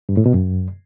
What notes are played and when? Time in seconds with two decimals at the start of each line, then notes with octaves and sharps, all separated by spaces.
0.09 G2
0.17 A2
0.26 B2
0.34 F#2